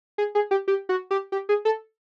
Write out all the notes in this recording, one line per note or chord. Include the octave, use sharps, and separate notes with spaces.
G#4
G#4
G4
G4
F#4
G4
G4
G#4
A4